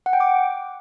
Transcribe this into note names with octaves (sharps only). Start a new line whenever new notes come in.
F#5
G5
D6